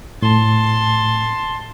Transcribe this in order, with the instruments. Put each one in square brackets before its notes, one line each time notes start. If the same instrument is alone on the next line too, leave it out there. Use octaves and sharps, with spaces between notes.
[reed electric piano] A2 [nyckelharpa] A5 C6